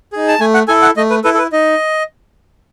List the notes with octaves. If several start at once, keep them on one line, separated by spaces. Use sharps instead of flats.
D#4 G#4
A5
A3 G#5
F#5
E4 A4 G#5
F#5
A3 D#5
B4
E4 A4 B4
A4
B4
D#4 D#5